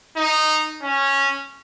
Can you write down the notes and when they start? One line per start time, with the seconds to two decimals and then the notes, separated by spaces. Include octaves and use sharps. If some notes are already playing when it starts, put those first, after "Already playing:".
0.17 D#4
0.82 C#4